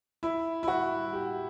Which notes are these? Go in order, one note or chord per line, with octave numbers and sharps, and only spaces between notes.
E4
E4
F#4
G4